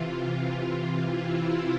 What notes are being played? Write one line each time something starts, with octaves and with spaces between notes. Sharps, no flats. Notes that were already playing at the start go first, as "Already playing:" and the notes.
Already playing: C3 E3 F4
E4